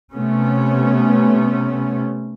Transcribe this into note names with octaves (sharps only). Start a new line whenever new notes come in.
C3 A3 B3 C#4